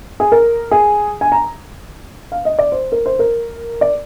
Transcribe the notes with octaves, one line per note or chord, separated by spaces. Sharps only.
G#4
A#4
G#4
G#5
A#5
F5
D#5
D5
C5
A#4
C5
A#4
D5